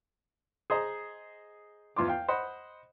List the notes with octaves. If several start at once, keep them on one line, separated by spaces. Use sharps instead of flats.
G#4 C5 D#5 A#5
E2 F4 C6 D6
F5 G5
C5 D#5 F#5 B5